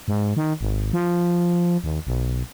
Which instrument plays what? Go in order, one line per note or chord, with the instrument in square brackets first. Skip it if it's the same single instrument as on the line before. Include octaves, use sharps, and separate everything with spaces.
[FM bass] G#2
D#3
G#1
F3
D#2
B1